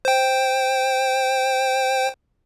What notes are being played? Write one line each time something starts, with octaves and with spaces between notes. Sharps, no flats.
C5 G5